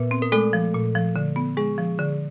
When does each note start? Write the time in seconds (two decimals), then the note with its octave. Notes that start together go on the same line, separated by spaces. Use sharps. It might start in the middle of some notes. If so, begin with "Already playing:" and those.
Already playing: A#2 B3 B4
0.11 C4
0.22 A#4
0.32 G#3 A3 A4
0.53 F3
0.74 A#2
0.95 F3
1.16 D3
1.36 B3
1.57 G#3 G#4
1.78 F3
1.99 D3